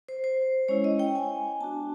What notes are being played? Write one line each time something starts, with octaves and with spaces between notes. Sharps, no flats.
C5
C5
G#3 C#4 E4 C#5
D#5
G5
G#5
B3 D4 F#4 A5